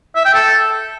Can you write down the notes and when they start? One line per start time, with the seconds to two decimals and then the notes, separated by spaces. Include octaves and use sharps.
0.16 E5
0.25 G5
0.34 A4